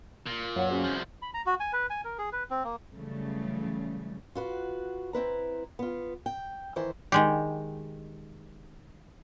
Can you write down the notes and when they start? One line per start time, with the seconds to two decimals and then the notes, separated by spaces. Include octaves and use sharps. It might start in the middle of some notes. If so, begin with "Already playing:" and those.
0.26 A#2
0.56 F#2 C#5 F5 F#5
0.71 C#4 F#4 G#4 C5
0.84 C2 F3
1.22 B5
1.34 A#5
1.46 F#4
1.60 G#5
1.73 B4
1.90 G#5
2.04 A#4
2.18 G#4
2.32 B4
2.50 C4
2.64 A#3
2.95 C#3 E3 F#3 G3 A3
4.35 F4 F#4 B4
5.13 C4 E4 B4 A#5
5.79 B3 F4
6.26 G5
6.76 D#3 E3 E4 C5
7.12 D#3 G#3 G4